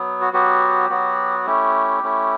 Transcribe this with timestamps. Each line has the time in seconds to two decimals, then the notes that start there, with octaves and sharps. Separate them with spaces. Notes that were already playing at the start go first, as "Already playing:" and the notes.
Already playing: F#3 B3
0.21 F#4
0.33 F#3 B3 F#4 G4
0.90 F#3 B3 F#4
1.46 A3 C#4 E4 G4
2.03 A3 C#4 E4